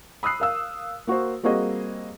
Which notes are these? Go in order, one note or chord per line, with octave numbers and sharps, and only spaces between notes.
B5 D#6 E6 F#6 C7
A#4 F5 E6
A#3 F#4 A#4 C5
G3 A#3 C4 F#4 G#4 D#5